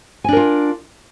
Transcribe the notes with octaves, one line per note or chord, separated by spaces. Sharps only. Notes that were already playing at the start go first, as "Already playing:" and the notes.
D4 F4 A#4 G#5